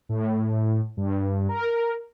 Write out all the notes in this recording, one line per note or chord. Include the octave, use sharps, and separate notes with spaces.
A2
G2
A#4